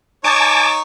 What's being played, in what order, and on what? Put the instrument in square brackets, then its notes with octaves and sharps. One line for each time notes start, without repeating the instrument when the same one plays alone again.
[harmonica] D#4 C#5 [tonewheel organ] G#5 A5 D6